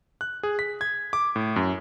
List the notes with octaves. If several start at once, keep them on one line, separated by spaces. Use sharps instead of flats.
F#6
G#4
B6
G#6
D6
A2
F#2